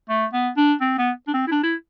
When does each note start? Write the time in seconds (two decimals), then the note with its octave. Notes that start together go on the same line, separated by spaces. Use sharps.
0.09 A3
0.33 B3
0.57 D4
0.81 C4
0.98 B3
1.28 D4
1.34 C4
1.47 E4
1.52 D4
1.63 E4